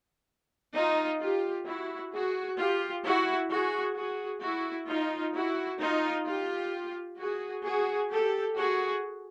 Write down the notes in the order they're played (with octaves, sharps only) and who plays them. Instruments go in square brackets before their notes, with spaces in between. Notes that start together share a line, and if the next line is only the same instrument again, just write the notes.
[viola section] D#4 F4
F4 G4
E4 F#4
F#4 G#4
F4 G4
E4 F#4
F#4 G#4
F#4 G#4
E4 F#4
D#4 F4
E4 F#4
D#4 F4
F4 G4
F#4 G#4
F#4 G#4
G4 A4
F#4 G#4